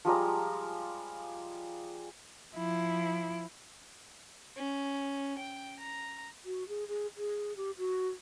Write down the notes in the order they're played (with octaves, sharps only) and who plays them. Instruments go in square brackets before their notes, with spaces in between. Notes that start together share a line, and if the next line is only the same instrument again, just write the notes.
[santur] F3 G3 G#3 A#5
[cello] F3 E4
[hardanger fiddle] C#4
G5
A#5
[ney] F#4
G#4
G#4
G#4
G4
F#4